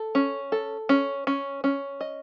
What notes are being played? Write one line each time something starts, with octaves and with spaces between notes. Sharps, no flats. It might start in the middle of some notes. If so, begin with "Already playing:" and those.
Already playing: A4
C#4
A4
C#4
C#4
C#4
D#5